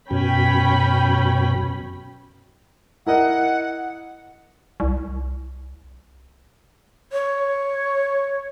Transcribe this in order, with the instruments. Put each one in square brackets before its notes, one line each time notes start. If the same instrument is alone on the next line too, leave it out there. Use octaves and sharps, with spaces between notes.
[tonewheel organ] F#2 B2 [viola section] C#4 G5 B5
[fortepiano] E4 A#4 D#5 [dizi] F#5
[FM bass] C2
[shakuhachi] C#5